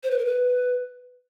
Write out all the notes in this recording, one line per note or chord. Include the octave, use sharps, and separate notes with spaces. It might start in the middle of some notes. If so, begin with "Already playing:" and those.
C5
B4
A#4
B4